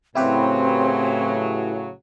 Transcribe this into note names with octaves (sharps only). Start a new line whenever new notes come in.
A2 C#3 F#3 C4 E4 G4 B4